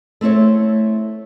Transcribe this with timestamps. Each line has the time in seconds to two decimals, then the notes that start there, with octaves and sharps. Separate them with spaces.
0.21 A3 C4 E4 C#5